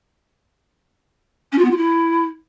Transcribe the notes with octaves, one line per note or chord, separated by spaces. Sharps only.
C#4
F4
B3
F4
E4